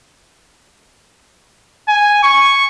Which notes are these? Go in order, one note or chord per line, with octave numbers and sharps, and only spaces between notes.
G#5
C#6